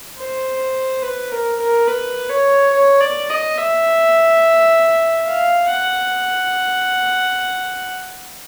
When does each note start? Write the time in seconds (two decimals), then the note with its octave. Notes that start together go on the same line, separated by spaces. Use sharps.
0.18 C5
1.03 B4
1.32 A#4
1.59 A#4
1.87 B4
2.30 C#5
2.73 C#5
3.00 D5
3.30 D#5
3.57 E5
5.27 F5
5.70 F#5